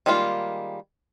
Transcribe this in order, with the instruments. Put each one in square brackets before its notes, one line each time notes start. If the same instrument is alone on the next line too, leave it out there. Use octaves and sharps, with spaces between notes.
[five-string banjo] D#3 G3 G#3 A#3 F4